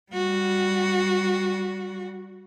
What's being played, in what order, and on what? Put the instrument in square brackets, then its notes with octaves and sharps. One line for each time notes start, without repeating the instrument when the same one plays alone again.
[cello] G3 F#4